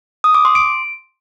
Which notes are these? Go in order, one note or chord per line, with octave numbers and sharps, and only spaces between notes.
D#6
D6
C6
D7